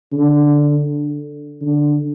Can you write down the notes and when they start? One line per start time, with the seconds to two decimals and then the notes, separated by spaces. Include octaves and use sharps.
0.12 D3
1.61 D3